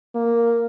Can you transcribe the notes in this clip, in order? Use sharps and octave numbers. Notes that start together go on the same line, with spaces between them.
A#3